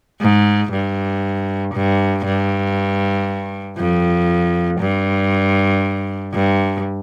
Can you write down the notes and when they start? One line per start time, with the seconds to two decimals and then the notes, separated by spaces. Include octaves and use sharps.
0.21 G#2
0.72 G2
1.74 G2
2.25 G2
3.78 F2
4.80 G2
6.34 G2